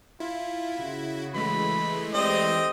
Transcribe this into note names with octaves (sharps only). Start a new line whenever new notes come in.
E4 F4
C#3 F#4
E3 G#3 A3 B5
C4 G4 C5 D5 D#5 D#6